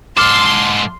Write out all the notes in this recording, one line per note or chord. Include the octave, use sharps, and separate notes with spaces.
G#2 A4 C6 D6 F6